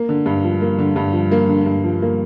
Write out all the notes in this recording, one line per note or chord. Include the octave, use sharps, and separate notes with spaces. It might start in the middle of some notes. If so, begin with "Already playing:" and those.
Already playing: A#3
D3
G2
F3
A#3
D3
G2
F3
A#3
D3
G2
F3
A#3